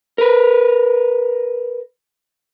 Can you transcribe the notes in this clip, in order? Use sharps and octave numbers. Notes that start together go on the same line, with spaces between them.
A#4 B4